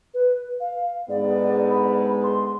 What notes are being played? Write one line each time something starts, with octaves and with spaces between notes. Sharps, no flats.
B4
F5
G#2 D3 B3 D5
B5
C6